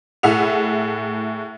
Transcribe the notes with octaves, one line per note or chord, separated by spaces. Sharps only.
A2 E4 G#4 E5 F#5 F7